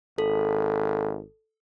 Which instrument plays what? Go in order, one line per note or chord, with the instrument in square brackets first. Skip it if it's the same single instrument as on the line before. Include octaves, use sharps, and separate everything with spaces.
[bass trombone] G#1 [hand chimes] A4